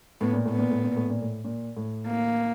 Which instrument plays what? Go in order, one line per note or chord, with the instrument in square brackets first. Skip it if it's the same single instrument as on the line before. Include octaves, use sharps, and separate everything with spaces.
[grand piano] A2 [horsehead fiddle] B3
[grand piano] A#2
A2
[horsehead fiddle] B3
[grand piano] A#2
A2
A#2
A2
A#2
A2
A#2
A2
[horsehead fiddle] A#3